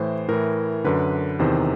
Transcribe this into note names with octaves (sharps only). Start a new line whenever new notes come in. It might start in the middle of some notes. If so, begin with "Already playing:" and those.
Already playing: A2 E3 C5
A2 E3 A#4
F#2 D3 B4
E2 C3 D#3 C5